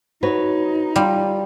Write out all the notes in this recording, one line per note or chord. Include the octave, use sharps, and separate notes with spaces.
D#4 F#4 B4 C#5
G3 F4